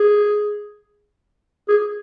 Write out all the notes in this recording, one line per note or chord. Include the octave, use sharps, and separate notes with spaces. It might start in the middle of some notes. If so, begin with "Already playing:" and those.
Already playing: G#4
G#4